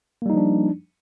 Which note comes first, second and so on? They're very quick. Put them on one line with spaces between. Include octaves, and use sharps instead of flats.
A#3 G3 D#4 F3 D4